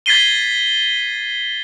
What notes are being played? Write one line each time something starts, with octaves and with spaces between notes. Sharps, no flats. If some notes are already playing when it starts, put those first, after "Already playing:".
G#6 A6 B6 C7 D#7 G7